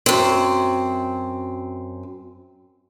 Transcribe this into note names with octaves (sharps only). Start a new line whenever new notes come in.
F#2 C4